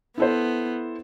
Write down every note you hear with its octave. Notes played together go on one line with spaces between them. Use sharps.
B3 E4 A4 C5